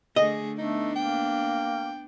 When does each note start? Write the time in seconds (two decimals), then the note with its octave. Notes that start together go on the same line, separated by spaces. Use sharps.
0.16 D3 A3 G#4 D#5
0.58 A3 B3 D4 D#4
0.95 A#3 G5